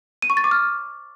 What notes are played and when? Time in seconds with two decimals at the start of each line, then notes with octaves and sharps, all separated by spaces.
0.22 D#7
0.30 C#6
0.37 A6
0.44 D6
0.51 F6